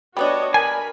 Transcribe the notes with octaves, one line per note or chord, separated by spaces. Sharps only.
G3 B3 D4 F#4 C#5 D#5
A#4 G#5 B5